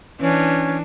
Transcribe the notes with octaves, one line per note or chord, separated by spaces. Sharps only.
E3 C#4 D4